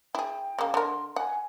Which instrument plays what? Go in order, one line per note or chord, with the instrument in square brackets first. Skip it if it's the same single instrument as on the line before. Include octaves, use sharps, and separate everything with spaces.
[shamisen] E4 G#4 [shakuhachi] G5
[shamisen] C#3 A#3
[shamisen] D3 A#4 [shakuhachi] C6
[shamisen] F#5 [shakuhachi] G#5